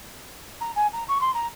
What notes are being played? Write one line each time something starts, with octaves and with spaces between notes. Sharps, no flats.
A#5
G#5
A#5
C#6
C6
A#5